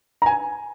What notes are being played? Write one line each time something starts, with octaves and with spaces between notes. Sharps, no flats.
A#5
G#5